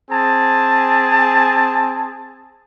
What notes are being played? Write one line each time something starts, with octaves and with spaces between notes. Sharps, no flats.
C4 G#4 G#5 A5